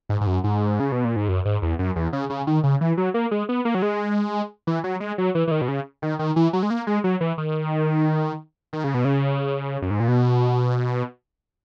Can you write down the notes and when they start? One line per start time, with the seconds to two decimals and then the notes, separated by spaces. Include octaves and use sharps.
0.09 G#2
0.21 G#2
0.27 F#2
0.44 G#2
0.80 C#3
0.92 B2
1.05 A#2
1.16 G#2
1.28 F#2
1.45 G#2
1.62 E2
1.79 F#2
1.96 E2
2.13 C#3
2.30 C#3
2.47 D#3
2.64 C#3
2.81 E3
2.97 F#3
3.14 A#3
3.31 G#3
3.49 B3
3.65 A#3
3.75 F#3
3.82 G#3
4.67 E3
4.84 F#3
5.00 G#3
5.18 F#3
5.35 E3
5.47 E3
5.51 D#3
5.61 B2
5.68 C#3
6.02 D#3
6.19 D#3
6.36 E3
6.53 F#3
6.63 G#3
6.70 A#3
6.87 G#3
7.04 F#3
7.21 E3
7.38 D#3
8.73 D#3
8.84 C#3
8.94 B2
9.05 C#3
9.82 F#2
9.91 G#2
10.00 A#2
10.08 B2